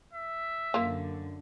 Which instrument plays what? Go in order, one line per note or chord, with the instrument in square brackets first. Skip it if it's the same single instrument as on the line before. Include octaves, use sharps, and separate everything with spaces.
[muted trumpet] E5
[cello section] F#2 D3 [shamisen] A#3 F4